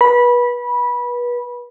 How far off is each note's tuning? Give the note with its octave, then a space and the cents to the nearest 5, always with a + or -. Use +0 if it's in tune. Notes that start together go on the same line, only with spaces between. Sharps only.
B4 -30 B5 -20